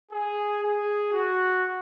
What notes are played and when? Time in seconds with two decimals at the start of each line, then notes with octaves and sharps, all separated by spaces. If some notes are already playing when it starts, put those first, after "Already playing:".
0.11 G#4
0.62 G#4
1.12 F#4